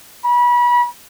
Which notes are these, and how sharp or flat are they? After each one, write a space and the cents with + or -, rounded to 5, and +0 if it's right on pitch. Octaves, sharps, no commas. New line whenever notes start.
B5 -30